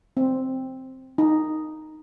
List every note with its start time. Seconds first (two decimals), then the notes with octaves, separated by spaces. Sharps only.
0.17 C4
1.18 D#4